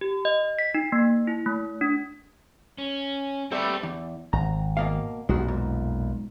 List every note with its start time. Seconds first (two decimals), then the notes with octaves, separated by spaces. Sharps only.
0.01 G4
0.25 D#5
0.59 B6
0.74 D#4
0.92 A#3
1.27 E4
1.46 A3
1.81 D4
2.78 C#4
3.51 G3 A3 B3 C4 G4
3.83 E2
4.33 G#1 A#5
4.77 B2 A#3 F5
5.29 B1 F2 A#2 G#3 F#4
5.48 G#2